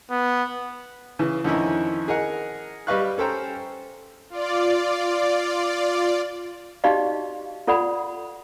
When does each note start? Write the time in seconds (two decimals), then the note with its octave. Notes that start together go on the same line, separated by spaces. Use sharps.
0.10 B3
1.19 C#3 E3
1.44 F2 D3 D#3 C#4 D#4 E4
2.08 G#4 A#4 D#5 F#5
2.87 G3 B4 D#5 F5 C#6 F#6
3.18 C#4 A4 C5 G5 A#5
4.30 F4 D5
6.84 D#4 F#4 G4 D5 D#5 F5
7.67 F4 A4 D5 F#5 B5